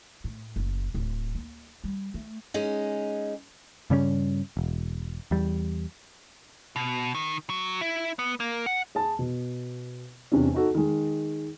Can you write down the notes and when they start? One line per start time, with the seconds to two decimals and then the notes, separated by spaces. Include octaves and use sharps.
0.24 A2
0.56 F#1
0.94 D1
1.35 A#3
1.84 G3
2.14 A3
2.54 G#3 C#4 D#4
3.90 G2 C#3 G3 C#4
4.57 E1
5.31 E2 G3
6.76 B2
7.15 D#3
7.50 F#3
7.81 E4
8.19 B3
8.40 A#3
8.66 F#5
8.95 G#4 A5
9.19 B2
10.32 E2 C3 C#4 D4
10.54 D#4 F#4 A4
10.75 D#3 G#3